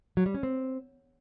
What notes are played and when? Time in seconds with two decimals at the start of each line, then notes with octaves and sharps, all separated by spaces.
0.17 F#3
0.26 G3
0.34 C#4
0.43 C4